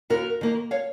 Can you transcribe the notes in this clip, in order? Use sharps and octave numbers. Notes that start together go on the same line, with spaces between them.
D#2 F#4 A#4
D#3 A#3
C#5 F5